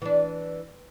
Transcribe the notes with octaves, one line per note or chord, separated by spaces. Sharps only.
E3 D4